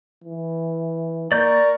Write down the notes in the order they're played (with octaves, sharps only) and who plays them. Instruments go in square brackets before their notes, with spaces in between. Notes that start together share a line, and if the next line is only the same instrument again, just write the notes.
[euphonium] E3
[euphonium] A#3 [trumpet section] A#4 A#5 C#6 [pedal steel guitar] D5 G6